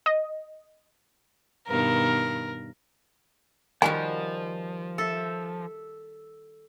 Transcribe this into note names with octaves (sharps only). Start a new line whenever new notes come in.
D#5
G2 B2 D#3 A#4
D#3 F3 G3 F#4 G#5
A4 E5